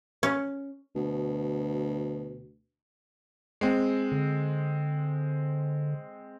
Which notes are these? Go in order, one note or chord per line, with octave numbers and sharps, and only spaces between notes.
C#4
D2 B2
G#3 C4
D3